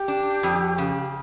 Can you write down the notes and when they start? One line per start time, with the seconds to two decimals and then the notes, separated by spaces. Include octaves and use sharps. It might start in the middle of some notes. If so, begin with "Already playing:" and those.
Already playing: G4
0.08 D4
0.43 F2
0.78 C#3